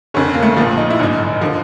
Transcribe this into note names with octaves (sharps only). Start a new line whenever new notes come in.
F1 F2 D3 C#4
A#3
A3
A#1 A#2 F3 A3
D#4
E4
G#1 F#2 D3 D#4
D3 F3